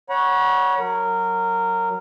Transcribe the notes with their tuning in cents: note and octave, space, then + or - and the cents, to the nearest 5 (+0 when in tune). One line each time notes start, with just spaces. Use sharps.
C#5 +0 F#5 +0 B5 -45
F#3 +0 A#4 -15